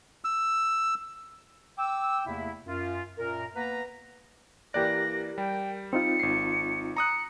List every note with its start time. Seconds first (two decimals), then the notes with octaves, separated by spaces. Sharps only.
0.25 E6
1.78 G5 D6 E6
2.27 E2 C3 A3 A#3 E4
2.66 F#2 F4
3.17 F#2 A#2 A#4
3.56 A#3 B3 B4 A#5
4.74 E3 A#3 G4 A#4 D5 F#6 A#6
5.38 G3 G5
5.93 C4 D#4 F4 C#7
6.19 G#1 C7
6.97 A#5 D#6 F#6 C#7